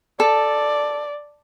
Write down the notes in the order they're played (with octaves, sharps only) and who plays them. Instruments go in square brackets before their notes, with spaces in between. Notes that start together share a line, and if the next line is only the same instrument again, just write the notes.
[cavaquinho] A4 [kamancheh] D5